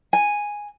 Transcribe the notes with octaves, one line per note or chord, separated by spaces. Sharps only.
G#5